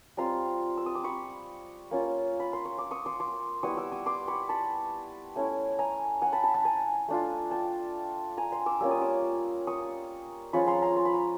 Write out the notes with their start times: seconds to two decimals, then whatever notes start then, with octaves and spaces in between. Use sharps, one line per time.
0.17 G3 C4 F4 A#5 C6
0.78 E6
0.86 D#6
0.95 D6
1.04 B5 C#6
1.91 A#3 C#4 F4
2.40 B5
2.53 C6
2.65 C#6
2.78 D6
2.91 C#6 D#6
3.06 C6 D6
3.20 C6 D6
3.63 G3 B3 E4 C#6 D#6
3.77 D6 E6
3.92 C#6 D#6
4.06 C6 D6
4.28 B5 C#6
4.49 A5 B5
5.36 A3 C#4 E4
5.79 G#5 A#5
6.22 F#5 G#5
6.32 A5 B5
6.43 A5 B5
6.54 A5 B5
6.65 G#5 A#5
7.08 A3 D4 F4
7.51 G5 A5
8.37 G#5 A#5
8.52 A#5 C6
8.66 D6 E6
8.80 G3 A#3 C#4 F4 E6
8.91 D#6
9.01 D6 E6
9.67 C#6 D#6
10.53 F3 G#3 C#4 F4 B5 C#6
10.68 A#5 C6
10.82 A#5 C6
10.96 C6
11.05 B5
11.14 A#5